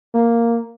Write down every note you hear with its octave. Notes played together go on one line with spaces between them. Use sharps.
A#3